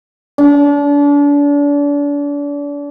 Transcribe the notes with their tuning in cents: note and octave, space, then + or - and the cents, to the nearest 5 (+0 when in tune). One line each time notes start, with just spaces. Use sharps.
D4 -35